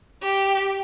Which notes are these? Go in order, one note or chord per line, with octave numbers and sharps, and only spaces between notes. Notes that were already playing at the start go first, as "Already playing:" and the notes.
G4